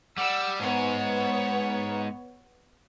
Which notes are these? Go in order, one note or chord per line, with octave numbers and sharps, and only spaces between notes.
G3 F#5 E6
G#2 B3 C#5